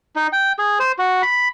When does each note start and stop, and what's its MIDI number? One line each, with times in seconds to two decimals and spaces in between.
0.16 0.27 63
0.33 0.52 79
0.59 0.79 68
0.80 0.92 72
0.98 1.22 66
1.22 1.48 83